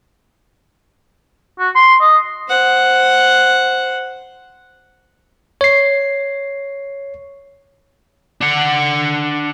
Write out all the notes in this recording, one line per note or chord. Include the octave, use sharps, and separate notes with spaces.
F#4
C6
D#5
C5 F#5
C#5 C7
D4 F#5